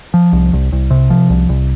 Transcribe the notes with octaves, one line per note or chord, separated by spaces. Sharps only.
F3
C2
C2
C2
C3
F3
C2
C2